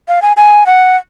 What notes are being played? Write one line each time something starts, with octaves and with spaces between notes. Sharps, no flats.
F5
G#5
G#5
F#5